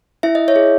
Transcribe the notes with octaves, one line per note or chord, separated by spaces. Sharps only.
E4 E5
D#5
C#5 E5
G#4